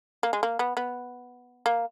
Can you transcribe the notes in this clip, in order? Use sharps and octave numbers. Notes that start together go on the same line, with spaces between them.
A#3
G#3
A#3
B3
B3
A#3